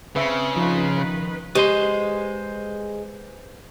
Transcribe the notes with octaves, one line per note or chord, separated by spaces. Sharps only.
C#3 C4 B4 E5
F3 D#4 F4 B4
D#3 B4
G#3 G4 B4 C5 C6